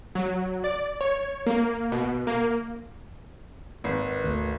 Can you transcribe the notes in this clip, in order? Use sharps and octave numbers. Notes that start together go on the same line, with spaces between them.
F#3
D5
C#5
A#3
B2
A#3
G#1 B4
D2